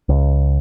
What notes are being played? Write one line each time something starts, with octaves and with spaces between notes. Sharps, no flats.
C#2